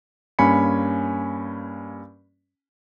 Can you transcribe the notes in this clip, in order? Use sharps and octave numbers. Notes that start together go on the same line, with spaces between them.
G2 A#3 C#4 G#5 B5 C#7